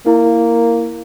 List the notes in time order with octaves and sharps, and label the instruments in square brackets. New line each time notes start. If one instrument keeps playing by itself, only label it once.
[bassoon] A#3 [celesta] E4